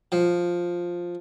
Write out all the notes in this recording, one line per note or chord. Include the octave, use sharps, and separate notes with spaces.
F3